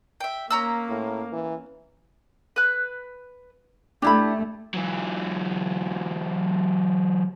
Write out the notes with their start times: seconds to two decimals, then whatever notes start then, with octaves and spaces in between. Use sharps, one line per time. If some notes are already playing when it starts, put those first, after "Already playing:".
0.20 E5 G5
0.51 A#3 C#4 A#5 E6
0.89 A2
1.32 E3
2.56 B4 F#6
4.02 A3 D4 E4 G4 B5
4.74 E3 F#3